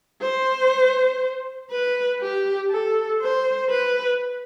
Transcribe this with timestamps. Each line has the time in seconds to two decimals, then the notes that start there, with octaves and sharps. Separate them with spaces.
0.22 C5
1.71 B4
2.21 G4
2.70 A4
3.20 C5
3.69 B4